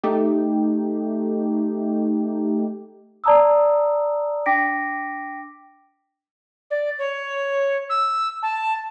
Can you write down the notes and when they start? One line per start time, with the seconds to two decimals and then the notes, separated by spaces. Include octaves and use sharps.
0.03 A3 D#4 G4
3.24 D5 A5 A#5 D#6 E6
4.46 D4 G5 D6 A#6 B6 D7
6.71 D5
6.99 C#5
7.90 E6
8.43 A5